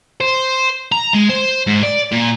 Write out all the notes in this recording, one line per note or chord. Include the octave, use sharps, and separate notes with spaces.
C5
A#5
G#3
C5
G#2
D5
A#2